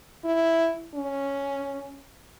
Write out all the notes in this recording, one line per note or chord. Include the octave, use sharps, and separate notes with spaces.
E4
C#4